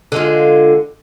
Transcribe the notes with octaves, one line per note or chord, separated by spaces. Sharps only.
D3 G#3 F4